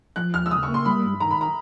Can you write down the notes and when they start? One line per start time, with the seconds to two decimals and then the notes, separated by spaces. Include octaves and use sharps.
0.16 F3 F#6
0.33 D#2 F6
0.46 E6
0.51 C#3 D#6
0.63 C#6
0.68 A#3
0.74 C6
0.85 G3 B5
1.03 G2
1.20 D#3 A#5
1.30 B5
1.41 A#5